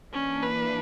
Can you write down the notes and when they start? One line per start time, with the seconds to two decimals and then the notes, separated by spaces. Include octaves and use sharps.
0.12 E3 A#3 C#4 D4
0.42 B4